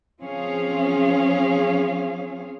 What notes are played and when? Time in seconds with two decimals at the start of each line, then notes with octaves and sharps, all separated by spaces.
0.21 F3 C4 C#4 G#4 F5